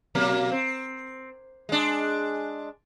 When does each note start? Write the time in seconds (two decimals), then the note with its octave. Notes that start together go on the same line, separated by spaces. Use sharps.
0.15 B2 F#3 A#3
0.52 C4
1.69 G#3 D4